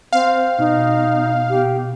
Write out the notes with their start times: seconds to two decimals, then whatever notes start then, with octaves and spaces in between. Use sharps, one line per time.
0.13 C4 F5
0.59 B2 D#4
1.49 G4